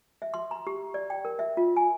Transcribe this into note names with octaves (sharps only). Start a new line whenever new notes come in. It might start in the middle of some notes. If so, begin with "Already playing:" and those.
E5
C6
A#5
G4
D5
G5
A#4
E5
F4
G#5